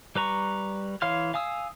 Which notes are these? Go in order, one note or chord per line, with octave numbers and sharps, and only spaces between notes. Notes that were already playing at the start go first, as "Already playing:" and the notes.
G3 B4 A#5 C#6
E3 C#5 F5 C6 F6
F5 G#5 D#6 E6